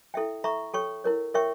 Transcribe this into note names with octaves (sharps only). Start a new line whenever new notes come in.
E4 A4 E5 G5
A4 E5 A#5 C#6
A4 C#5 G5 C#6
E4 A#4 C#5
A#4 C#5 E5 G5 C#6